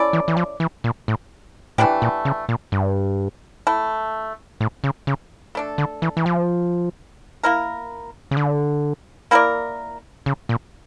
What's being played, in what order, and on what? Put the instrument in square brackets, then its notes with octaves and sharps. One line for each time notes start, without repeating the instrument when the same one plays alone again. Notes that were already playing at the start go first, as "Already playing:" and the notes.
Already playing: [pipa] C#4 E4 A4 D5
[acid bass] E3
E3
F3
E3
A#2
A2
[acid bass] A2 [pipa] E3 A3 D4 G4
[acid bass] A#2
C#3
A#2
G2
[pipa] A3 E4 A4
[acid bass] A2
C#3
C#3
[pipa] A3 D4 A4
[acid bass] D3
E3
E3
F3
[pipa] A#3 E4 A#4
[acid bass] C#3
D3
[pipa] A#3 E4 A#4 D5
[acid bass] C#3
A#2